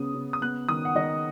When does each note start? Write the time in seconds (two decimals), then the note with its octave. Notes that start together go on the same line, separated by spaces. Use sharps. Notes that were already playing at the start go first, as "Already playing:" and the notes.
Already playing: C#3 B3 D#6
0.15 C#3
0.33 D#6
0.42 B3 F#6
0.69 D#3 D#6
0.85 F#5
0.95 D#3 D#5